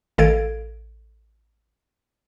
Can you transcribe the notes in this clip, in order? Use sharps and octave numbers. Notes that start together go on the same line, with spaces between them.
A1 D#3 A4 F5 G#6 D7